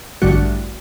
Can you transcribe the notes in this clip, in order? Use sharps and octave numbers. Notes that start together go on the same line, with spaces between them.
A1 G2 D3 G3 F#4